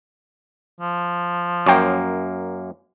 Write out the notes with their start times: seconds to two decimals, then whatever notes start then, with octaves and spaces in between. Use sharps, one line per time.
0.81 F3
1.66 F#2 A#3 C#5 G5